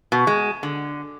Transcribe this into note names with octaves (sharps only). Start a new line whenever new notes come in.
B2
G#3
D3